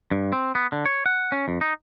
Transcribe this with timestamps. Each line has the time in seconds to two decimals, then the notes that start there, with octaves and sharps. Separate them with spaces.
0.11 G2
0.33 C4
0.55 B3
0.72 D3
0.86 C#5
1.06 F#5
1.32 C#4
1.48 F2
1.61 D#4